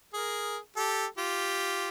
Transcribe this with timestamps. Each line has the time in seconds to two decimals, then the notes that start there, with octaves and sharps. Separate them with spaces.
0.14 G#4 A#4
0.77 G4 A4
1.18 F4 G4